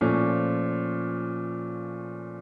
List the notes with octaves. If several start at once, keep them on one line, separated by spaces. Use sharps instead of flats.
A#2 F3 A3 C#4